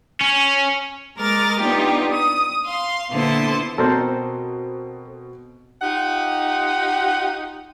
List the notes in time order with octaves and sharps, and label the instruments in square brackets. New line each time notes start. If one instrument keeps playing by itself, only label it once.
[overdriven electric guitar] C#4
[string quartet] G#3 A#4 D6 F6 A6
B3 D4 D#4 F4 G4
D#6
F5 C6
A#2 D3 B3 E4 C5 A5
[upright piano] B2 C4 [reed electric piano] A4 A#4 C5
[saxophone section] D#4 F4 G4 F#5